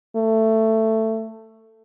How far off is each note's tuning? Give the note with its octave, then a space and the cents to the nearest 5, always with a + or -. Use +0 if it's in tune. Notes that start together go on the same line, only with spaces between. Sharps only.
A3 +15